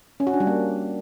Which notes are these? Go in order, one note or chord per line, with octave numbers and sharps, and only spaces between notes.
C#4
F#4
D4
G3
A#3